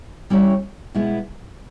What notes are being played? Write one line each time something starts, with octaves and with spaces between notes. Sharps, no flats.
G3 C#4 E4 G4 C#5
B2 G#3 B3 E4